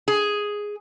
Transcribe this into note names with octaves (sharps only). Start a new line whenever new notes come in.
G#4